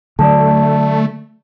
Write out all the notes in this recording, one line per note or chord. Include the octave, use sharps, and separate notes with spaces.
D3 F#3 A3 D5 A5